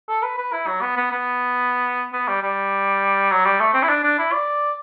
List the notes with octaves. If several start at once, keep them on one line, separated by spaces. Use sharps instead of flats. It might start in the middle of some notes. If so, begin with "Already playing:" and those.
A4
B4
B4
E4
F#3
B3
B3
B3
B3
G3
G3
F#3
G3
A3
C4
E4
D4
D4
E4
D5